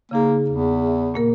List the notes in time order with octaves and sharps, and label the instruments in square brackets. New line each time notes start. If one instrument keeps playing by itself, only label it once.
[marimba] C#3 D#4 G#4 [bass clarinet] A#3
[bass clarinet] E2
[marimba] E5
A#2 A#3 A#4